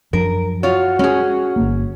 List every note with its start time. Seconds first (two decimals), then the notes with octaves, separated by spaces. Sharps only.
0.13 F#2 F3 D4 A#4
0.63 F4 F#4 C#5
0.99 G#3 C#4 G#4
1.56 G1 A#3